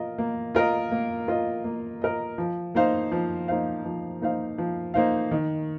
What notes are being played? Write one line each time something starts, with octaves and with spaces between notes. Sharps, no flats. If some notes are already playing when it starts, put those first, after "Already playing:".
Already playing: A#3 F4 A#4 D#5
A#3
F4 A#4 D#5
A#3
F4 A#4 D#5
A#3
F4 A#4 D#5
F3
A#3 D#4 C5 F5
F3
A#3 D#4 C5 F5
F3
A#3 D#4 C5 F5
F3
A#3 D#4 C5 F5
D#3